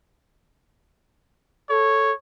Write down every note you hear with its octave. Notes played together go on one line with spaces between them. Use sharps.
A4 C#5